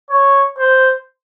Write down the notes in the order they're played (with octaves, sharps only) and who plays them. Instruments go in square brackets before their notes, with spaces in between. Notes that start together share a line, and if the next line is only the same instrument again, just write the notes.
[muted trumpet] C#5
C5